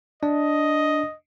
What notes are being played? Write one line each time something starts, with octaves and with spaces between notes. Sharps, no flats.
D4 D5 D#5